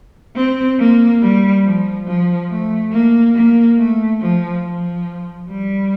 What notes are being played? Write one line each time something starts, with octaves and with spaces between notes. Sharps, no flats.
C4
A#3
G3
F3
F3
A3
A#3
A#3
A3
F3
F3
G3